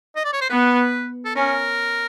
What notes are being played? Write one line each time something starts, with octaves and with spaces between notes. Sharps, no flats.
D#5
D5
C#5
C5
B3 B4
A4
C#4 A#4